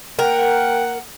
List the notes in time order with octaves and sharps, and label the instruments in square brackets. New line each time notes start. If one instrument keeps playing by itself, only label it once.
[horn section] A#3 F#5 [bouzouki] A#4 [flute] G5